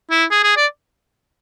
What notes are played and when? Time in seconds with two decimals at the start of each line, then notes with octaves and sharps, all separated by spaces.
0.10 E4
0.31 G#4
0.44 G#4
0.57 D5